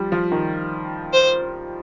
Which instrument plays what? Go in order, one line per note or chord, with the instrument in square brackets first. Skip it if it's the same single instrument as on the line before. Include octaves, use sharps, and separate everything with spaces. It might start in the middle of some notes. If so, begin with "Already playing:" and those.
Already playing: [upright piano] F3 G3
F3
D#3
[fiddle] C5